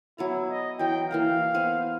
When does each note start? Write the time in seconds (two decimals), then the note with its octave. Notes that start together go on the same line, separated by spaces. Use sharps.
0.18 F#3 B3 E4 A#5
0.49 D#5
0.79 E3 F#3 G5
1.11 E3 A#3 F5 A#5
1.54 B3 C5 G#5